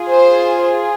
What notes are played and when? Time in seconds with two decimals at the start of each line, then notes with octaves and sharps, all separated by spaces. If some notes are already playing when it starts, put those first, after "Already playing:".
Already playing: F4 G#4
0.10 C5